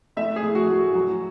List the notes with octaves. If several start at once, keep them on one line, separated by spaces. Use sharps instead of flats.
A3 E5
G#4
A2
F#4
A3
F#4
F#3 F#4